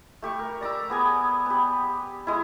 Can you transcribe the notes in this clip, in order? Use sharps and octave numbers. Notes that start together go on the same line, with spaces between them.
A3 G4 C#6
A#4
D5 A#5 D6 E6
B3 G#4 G#5
B3 G4
G#3 E4